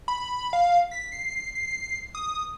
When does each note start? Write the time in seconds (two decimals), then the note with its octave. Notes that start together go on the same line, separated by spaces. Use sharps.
0.08 B5
0.53 F5
0.91 B6
1.12 C7
1.55 C7
2.15 D#6